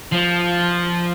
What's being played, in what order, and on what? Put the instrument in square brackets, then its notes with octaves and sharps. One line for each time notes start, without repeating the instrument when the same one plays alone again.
[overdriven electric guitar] F3